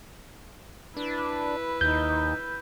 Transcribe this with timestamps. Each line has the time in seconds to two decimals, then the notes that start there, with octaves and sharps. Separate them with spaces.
0.97 D4 E4 B4
1.81 D#2 D#4 G6